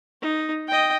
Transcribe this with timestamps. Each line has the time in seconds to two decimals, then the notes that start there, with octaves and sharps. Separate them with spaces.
0.22 D#4
0.68 D#5 G5